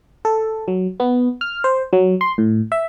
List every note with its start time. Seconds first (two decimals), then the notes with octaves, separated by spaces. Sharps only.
0.25 A4
0.68 F#3
1.00 B3
1.41 F6
1.64 C5
1.93 F#3
2.21 C6
2.38 A2
2.72 E5